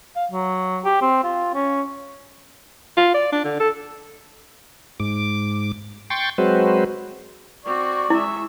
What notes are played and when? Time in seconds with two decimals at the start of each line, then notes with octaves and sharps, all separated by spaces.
0.16 F5
0.32 F#3
0.85 G4
1.02 C4
1.24 F4
1.54 C#4
2.97 F4
3.14 D5
3.32 D4
3.44 D3
3.60 A4
5.00 G#2 D6
6.10 G5 C6 C#6 G6 A6
6.38 F#3 G#3 C4 F#4 B4 C5
7.66 C4 F#4 D5 C#6
8.10 G#3 E4 E5